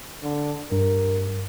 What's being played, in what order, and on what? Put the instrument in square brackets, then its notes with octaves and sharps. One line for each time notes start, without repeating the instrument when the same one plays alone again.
[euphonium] D3
[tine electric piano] G2 [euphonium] A#4